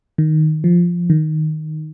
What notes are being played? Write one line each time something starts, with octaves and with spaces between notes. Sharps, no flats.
D#3
F3
D#3